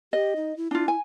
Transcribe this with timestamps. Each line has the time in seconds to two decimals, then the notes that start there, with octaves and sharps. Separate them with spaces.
0.13 G4 D#5
0.36 D#4
0.57 E4
0.71 D4 E4 F4
0.88 G#5